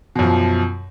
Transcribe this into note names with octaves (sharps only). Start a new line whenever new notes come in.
F#2 B2 F3